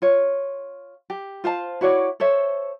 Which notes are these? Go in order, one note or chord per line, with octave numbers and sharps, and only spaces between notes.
F4 C#5
G4
F4 C5 F5 A5
E4 F#4 C#5 D5
A4 C5 C#5 E5